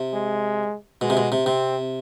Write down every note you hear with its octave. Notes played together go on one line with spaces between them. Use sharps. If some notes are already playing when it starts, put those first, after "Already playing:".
Already playing: C3
G#3
B2 G#3
C3
B2
C3
C3 C4